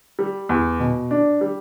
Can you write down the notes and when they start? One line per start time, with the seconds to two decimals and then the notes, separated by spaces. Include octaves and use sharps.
0.19 G3
0.49 E2
0.80 B2
1.11 D4
1.41 G3